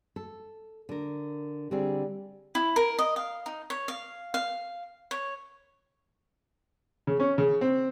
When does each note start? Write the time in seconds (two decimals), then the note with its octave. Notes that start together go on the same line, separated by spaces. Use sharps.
0.16 A4
0.89 D3 A#4
1.71 D3 G3 C4 G#4
2.55 E4
2.76 A#4
2.99 D#5
3.16 F5
3.46 D#4
3.70 C#5
3.88 F5
4.34 F5
5.11 C#5
7.07 C#3
7.20 C#4
7.38 C#3
7.61 C4